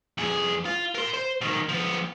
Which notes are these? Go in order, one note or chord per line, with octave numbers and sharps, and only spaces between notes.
F2 G#4
F4
A#4 C6
C5
B2 D#3
F3 B3